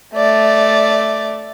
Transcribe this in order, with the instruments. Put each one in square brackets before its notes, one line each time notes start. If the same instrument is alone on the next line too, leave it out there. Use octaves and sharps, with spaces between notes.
[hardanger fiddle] A3 D5